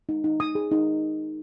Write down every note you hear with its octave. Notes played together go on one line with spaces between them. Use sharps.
D#4
D#4
D#4 D#6
G#4
D#4